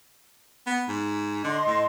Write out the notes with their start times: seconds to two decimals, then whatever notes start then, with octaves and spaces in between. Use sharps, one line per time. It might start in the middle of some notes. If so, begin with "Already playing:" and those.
0.67 B3
0.88 G#2
1.44 D3 D#5 C6
1.67 A2